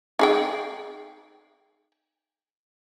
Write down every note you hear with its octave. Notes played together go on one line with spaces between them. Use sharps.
D#4 G#4 G5